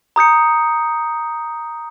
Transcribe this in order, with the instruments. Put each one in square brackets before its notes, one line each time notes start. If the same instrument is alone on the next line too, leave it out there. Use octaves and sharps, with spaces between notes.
[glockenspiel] A#5 D#6 G6 C#7